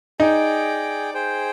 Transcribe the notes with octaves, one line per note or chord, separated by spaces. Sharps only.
D#4 G#4 D5 G5
G#4 C5 G5